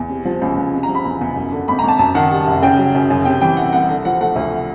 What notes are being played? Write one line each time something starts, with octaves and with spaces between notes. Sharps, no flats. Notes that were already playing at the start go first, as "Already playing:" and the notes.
Already playing: E2
C3
F3
C#2
C#2
C3
A#5
F3
B5
E2
E2
F#2
D3
G#1 B5
G#1 A#5
A5
F#2 A5
D#3 F#5
G3
F#1
C#3 G5
F#3
F#2
F#2
C3 G5
E3 G5
C2 F#5
C2 F#5
D3
F3 F#5
A3 F#5
D2